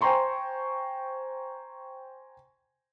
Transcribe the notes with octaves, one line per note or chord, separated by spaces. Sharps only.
C5 G5 G#5 A#5 C6 C#6